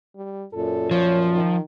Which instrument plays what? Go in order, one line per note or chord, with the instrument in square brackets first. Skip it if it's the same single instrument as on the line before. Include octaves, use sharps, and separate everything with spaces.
[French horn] G3
[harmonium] F#2 A#2 [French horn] A4
[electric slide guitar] F3 [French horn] C#5
[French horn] D#3